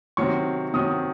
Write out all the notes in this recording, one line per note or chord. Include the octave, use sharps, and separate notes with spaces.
C3 D#3 F#3 C#6
C3 D#3 F#3 D#6